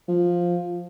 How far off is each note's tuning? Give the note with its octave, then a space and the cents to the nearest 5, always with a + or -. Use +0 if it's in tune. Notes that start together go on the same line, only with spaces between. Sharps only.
F3 +5